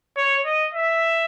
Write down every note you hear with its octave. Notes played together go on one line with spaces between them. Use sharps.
C#5
D#5
E5